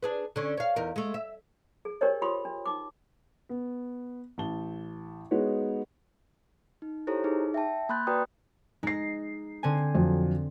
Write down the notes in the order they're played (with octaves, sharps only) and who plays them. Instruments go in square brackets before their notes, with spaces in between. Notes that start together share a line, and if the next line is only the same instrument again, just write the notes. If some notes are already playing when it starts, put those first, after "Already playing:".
[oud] D4 G#4 B4
D3 C#4
C#5 F5
E2 D#4 A#4
G#3 A3
E5
[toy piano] G#4
D4 G4 A#4 C5 C#5 D#5
F4 G4 B5 C6 D#6
D4
D#4 D6
[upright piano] B3
A1 A5 G7
G#3 B3 D#4 F#4 B4 C#5
[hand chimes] D#4
E4 G4 A4 C5 C#5 A#5
D#4 G#4
E5 G5 A5
A#3 B5 C6 F#6 G6 A6
F#4 B4 D5 G5 A#5 D#6
[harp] G#3 A#6 [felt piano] D#4 C7
[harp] D3 C4 G#5
[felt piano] F2 F#3